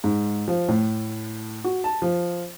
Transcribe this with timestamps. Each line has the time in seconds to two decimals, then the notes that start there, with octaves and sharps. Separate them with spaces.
0.04 G#2
0.48 F3
0.68 A2
1.64 F#4
1.84 A5
2.02 F3